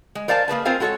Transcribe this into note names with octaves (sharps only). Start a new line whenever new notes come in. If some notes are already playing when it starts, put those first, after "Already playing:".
G#3
A#4 C5 D5 F5 G#5 A5
A#3 G#4 B4 A5
C4 F4 A#4 C5 F5 G#5
G#3 F#4 A4 B4 C#5